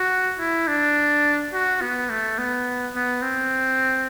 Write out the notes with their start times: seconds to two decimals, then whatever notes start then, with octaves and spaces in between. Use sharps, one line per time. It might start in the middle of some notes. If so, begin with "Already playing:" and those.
Already playing: F#4
0.39 E4
0.68 D4
1.53 F#4
1.81 B3
2.10 A3
2.38 B3
2.95 B3
3.23 C4